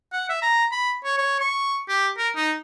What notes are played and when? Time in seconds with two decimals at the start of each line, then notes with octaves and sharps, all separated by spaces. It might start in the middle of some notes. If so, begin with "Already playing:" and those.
0.13 F#5
0.30 E5
0.42 A#5
0.72 B5
1.05 C#5
1.18 C#5
1.40 C#6
1.89 G4
2.18 A#4
2.36 D#4